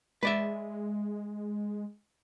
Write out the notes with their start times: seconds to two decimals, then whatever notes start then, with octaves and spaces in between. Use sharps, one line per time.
0.23 G#3 B4 D5 E5